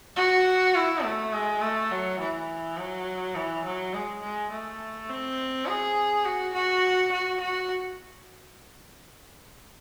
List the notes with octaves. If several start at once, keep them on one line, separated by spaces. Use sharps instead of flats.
F#4
E4
A3
G#3
A3
F#3
E3
F#3
E3
F#3
G#3
G#3
A3
C4
G#4
F#4
F#4
F#4
F#4